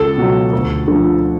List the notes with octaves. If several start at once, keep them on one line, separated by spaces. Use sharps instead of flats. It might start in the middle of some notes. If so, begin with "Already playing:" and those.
Already playing: C#2 A4
B2 F#3
D2
D3 F3